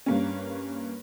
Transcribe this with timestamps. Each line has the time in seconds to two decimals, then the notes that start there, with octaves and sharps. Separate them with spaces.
0.06 G2 A#3 C#4